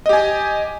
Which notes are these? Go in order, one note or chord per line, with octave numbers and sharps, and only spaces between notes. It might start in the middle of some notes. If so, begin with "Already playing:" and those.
G4 D#5 G#5